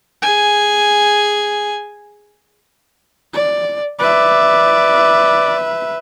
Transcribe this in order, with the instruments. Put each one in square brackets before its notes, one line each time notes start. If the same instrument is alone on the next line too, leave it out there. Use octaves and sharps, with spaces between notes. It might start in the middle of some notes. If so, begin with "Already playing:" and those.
[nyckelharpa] G#4 G#5
[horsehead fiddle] D5
[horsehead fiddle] B4 E5 [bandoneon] D5 D6